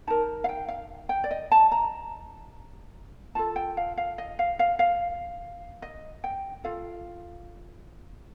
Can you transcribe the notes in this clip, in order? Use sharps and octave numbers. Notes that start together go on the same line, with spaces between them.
D#4 A#4 A5
F5
G5
F5
G5
D5
D#5
A5
A#5
F4 A4 A5
G5
F5
F5
D#5
F5
F5
F5
D#5
G5
F4 A4 F5